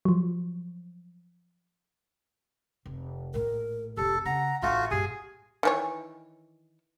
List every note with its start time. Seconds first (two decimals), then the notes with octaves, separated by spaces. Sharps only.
0.05 F3 F#3
2.86 F1
3.34 A#1 A2 A#4
3.97 F1 A#1 G4 A4
4.25 C#3 F#5 A#5
4.62 A1 A3 D#4 F4 F#4 F5
4.91 G2 A#2 G4 G#4 G#5
5.63 D#3 E3 C#5